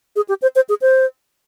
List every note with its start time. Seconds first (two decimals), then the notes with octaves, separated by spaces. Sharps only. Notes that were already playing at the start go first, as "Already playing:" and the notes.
0.16 G#4
0.29 G4
0.42 C5
0.56 C5
0.69 G#4
0.82 C5